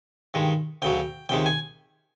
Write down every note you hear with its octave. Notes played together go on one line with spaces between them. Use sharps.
G2 D#3 G#3
D2 C#3 F#3 G5
C#2 C3 D#3 G#3 G5
G#5